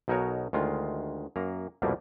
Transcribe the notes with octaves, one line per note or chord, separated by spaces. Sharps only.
B1 B2 D#4 F#4 A#4 C#5
D2 D#3 G#3 F4
F#2 A#3 A#5
C2 F2 B2 G3 A3 A#3